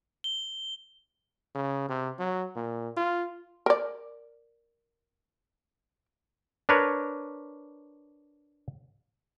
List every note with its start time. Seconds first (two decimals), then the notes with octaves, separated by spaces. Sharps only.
0.24 G7
1.55 C#3
1.88 C3
2.19 F#3
2.56 A#2
2.97 F4
3.66 A#4 D5
6.69 D4 A#4 B4 C#5